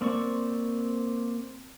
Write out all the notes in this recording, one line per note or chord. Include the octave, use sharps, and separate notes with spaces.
A#3 C4 D5 C#6